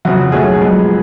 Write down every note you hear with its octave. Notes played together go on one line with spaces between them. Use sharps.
F1 F2 C#3 F#4
B1 B2 A3 C#4 G#4
F#2 F3 G#3 B3